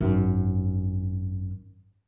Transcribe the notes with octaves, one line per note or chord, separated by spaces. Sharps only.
G#1 F#2